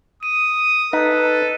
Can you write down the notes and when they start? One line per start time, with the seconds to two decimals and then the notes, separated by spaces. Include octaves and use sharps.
0.23 D#6 D#7
0.93 D#4 A4 B4